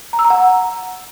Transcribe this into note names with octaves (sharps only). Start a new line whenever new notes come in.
A#5
E6
A#5
F#5